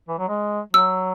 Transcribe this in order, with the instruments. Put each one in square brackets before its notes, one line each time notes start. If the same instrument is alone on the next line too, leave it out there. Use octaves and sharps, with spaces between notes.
[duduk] E3
F#3
G#3
[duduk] F#3 [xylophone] E6